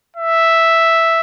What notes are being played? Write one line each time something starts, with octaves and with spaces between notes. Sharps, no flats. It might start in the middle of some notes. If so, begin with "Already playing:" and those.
E5